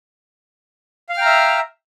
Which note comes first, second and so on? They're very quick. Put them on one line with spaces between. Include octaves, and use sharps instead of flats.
F5 F6 G5 A#5 E5